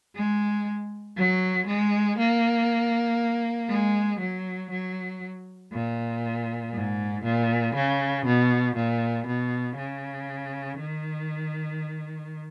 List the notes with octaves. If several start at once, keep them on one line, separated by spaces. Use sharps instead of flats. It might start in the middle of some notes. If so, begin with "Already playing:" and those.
G#3
F#3
G#3
A#3
G#3
F#3
F#3
A#2
G#2
A#2
C#3
B2
A#2
B2
C#3
D#3